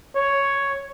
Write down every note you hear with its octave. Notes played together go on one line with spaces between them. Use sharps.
C#5